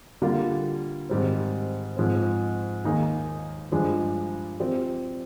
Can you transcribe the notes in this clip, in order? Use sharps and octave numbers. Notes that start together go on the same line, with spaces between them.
D3 G3 A#3 F4
G#2 D#3 G3 C4
G#2 F3 C4
D#2 D#3 A#3 D#4 G#4
G2 F3 G#3 D4 G#4
F3 C4 G4 D5